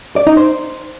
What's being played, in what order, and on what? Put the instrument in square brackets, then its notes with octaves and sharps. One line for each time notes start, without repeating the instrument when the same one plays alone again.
[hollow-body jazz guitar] D5
D#4
C5